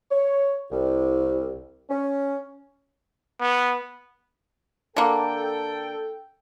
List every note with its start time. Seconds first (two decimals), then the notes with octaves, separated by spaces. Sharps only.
0.11 C#5
0.71 C2
1.89 C#4
3.40 B3
4.96 D3 A#3 A4 G5